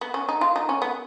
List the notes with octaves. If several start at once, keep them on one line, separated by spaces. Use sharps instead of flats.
B3
C#4
D#4
F4
D#4
C#4
B3